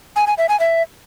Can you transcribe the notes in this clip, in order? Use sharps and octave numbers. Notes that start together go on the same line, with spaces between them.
G#5
G#5
E5
G#5
E5